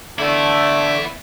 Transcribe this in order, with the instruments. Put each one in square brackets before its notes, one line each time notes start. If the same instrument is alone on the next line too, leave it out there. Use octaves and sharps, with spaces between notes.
[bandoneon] D3 D6 [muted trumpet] A3 [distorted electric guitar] B3 E4